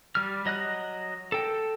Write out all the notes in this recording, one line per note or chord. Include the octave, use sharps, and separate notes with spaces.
G3 F6
F#3 D#5 F#5 F#6
A4 G5